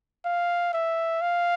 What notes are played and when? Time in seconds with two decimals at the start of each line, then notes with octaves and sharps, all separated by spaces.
0.25 F5
0.73 E5
1.21 F5